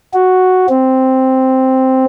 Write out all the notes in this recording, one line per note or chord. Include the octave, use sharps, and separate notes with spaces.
F#4
C4